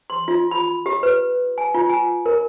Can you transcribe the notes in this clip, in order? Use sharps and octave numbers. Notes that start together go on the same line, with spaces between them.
C6
F4
B5
G4
B4
G#5
F4
G#5
A#4